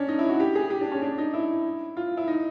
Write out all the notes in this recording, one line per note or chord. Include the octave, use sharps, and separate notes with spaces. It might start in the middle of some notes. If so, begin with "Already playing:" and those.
Already playing: C#4 D4
D#4
E4
F#4
G4
G#4
G4
D4
C#4
D4
D#4
E4
F4
E4
D#4